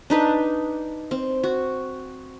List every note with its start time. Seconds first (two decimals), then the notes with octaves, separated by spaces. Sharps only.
0.10 D4 D#4 B4
1.11 C4
1.43 F#4